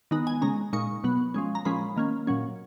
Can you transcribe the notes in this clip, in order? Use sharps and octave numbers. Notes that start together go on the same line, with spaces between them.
D#3 G#3 B3 D#4
G#5
C#3 G#3 C#4 A#5
A#2 G#3 D#4 C#6
B2 F#3 B3
F3 G#3 C#4
A#5
A#2 F3 G#3 C#4 B5
D#3 A#3 C#4
A#2 F#3 C#4